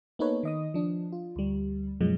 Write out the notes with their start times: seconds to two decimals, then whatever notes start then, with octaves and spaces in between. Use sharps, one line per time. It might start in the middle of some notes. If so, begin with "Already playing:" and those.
0.19 A#3 B3 D#4 A4 B4 C#5
0.43 D#3 D#5 D#6
0.74 F3 D4
1.12 F4
1.36 D2 G3
2.01 F#2 B2 F3 F#3 G#3